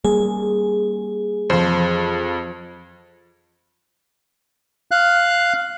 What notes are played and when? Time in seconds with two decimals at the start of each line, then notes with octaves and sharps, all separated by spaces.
0.04 G3 A#3 G#4
1.50 F2 F3 C5
4.91 F5 F#6